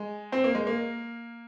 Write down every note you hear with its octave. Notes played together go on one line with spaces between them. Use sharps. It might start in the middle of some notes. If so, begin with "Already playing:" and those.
Already playing: G#3
C4
A#3
G#3
A#3